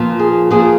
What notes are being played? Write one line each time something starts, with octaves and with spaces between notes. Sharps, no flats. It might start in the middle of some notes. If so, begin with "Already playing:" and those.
Already playing: A#2 F3
G#4
A#2 F3 G#4